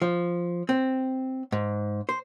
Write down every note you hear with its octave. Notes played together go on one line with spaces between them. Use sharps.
F3
C4
G#2
C5